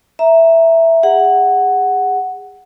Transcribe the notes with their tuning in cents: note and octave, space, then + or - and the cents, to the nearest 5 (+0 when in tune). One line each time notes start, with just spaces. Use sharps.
E5 +0 A#5 +0
G#4 -30 F#5 +0